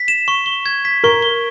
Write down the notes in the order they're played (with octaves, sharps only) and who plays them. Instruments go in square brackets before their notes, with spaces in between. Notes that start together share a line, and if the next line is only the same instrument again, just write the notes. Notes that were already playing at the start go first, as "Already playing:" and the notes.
Already playing: [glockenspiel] B6
E7
C#6
G7
G#6
B6
[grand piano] A#4 [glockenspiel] C#6
[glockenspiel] G7